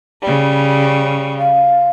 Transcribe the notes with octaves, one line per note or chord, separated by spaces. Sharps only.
C#3 G3
F5